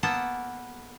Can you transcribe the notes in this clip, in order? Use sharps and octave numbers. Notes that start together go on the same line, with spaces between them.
A#3 B3 A4 A5